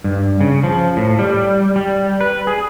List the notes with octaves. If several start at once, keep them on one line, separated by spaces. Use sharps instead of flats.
G2
C#3
F3
A2
G3
G3
B4
G#4